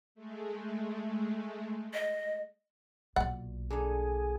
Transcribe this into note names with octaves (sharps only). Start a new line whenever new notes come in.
G#3 A3
D#5
B1 A#2 D5 F#5
D3 D4 D#4 G#4